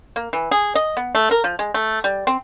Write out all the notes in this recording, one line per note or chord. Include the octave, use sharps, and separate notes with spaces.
A#3
E3
G#4
D#5
B3
A3
A#4
F3
G#3
A3
G3
C4